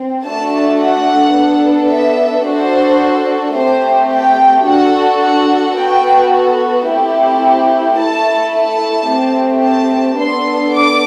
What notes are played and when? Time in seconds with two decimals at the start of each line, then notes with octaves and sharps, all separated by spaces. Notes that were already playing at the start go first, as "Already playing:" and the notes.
Already playing: C4
0.25 A3 D4 F#4 A4 A5
0.80 F#5
1.35 B3 D4 A4
1.91 E5
2.46 D4 F#4 A4 C5
3.56 A3 C4 G4 C5
4.12 G5
4.67 D4 F#4 A4 F#5
5.22 F#5
5.78 B3 F#4 A4 G5
6.88 A3 C4 E4 G4
7.98 A3 E4 A4 A5
8.54 A5
9.09 A3 C4 G4
9.65 A5
10.19 B3 D4 A4 C6
10.75 D6